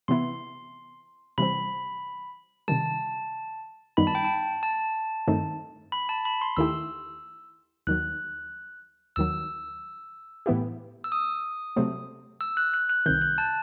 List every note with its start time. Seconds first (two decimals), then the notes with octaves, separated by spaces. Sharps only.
0.08 C3 E3 B3 E4 C6
1.38 C3 E3 G3 C4 B5
2.68 C3 D#3 G3 A5
3.97 F#2 D#3 G3 B3 D#4 B5
4.07 A5
4.15 G5
4.25 A5
4.63 A5
5.28 G2 D#3 A3 C4 D#4
5.92 B5
6.09 A5
6.25 B5
6.42 C6
6.57 D#2 D#3 A3 E4 G4 E6
7.87 D#2 D#3 F#3 F#6
9.16 D#2 D#3 F#3 E6
10.46 A2 E3 B3 E4 G4
11.04 E6
11.12 D#6
11.76 C3 F#3 A3 C4
12.41 E6
12.57 F#6
12.74 F#6
12.89 F#6
13.06 C2 C3 D#3 G6
13.22 F#6
13.38 A5